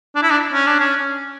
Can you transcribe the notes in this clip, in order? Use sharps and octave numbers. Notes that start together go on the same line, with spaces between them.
D4
E4
D4
C#4
D4
C#4